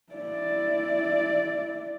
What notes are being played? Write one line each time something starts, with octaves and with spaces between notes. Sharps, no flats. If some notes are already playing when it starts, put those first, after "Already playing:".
E4 D5